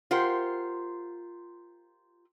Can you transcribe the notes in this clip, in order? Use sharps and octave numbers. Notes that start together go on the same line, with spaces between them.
F4 G4 A#4 C5 F#5